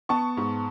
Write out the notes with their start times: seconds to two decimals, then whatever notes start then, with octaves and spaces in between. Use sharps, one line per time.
0.09 B3 A5 C#6
0.37 G#2